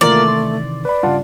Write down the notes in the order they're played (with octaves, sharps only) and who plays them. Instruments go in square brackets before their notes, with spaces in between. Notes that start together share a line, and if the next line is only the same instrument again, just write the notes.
[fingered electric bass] C3 D#3 E3 [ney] A3 [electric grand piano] A#3 F4 A#4 [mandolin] D5
[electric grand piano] C6
[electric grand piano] B4 B5 [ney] D5
[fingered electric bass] G2 C#3 [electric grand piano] F4 F#5 A5